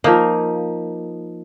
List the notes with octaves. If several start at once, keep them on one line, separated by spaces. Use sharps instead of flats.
F3 A#3 D#4